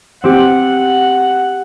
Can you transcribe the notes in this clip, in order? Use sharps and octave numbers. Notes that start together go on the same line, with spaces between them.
C4 G4 F#5